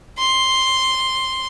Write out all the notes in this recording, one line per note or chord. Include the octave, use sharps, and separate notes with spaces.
C6